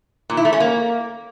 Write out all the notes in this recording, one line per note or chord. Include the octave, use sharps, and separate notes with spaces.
A#2
E4
A3
C#4
A#3